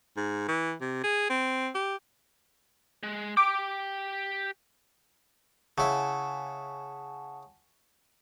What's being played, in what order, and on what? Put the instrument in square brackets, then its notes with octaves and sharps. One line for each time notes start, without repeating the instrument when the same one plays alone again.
[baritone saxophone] G#2
E3
C3
G#4
C4
G4
[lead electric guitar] G#3
[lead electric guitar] G4 G5 [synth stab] D6
[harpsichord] C#3 E4 [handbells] F#5 G#5 A5